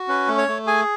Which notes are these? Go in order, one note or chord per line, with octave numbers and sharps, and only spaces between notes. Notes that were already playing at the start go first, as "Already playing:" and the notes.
Already playing: F#4
C#4 B4
A3
C#5
A3
G#4 G#5